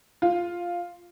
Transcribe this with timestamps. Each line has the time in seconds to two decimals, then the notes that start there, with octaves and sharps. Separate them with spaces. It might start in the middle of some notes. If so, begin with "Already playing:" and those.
0.22 F4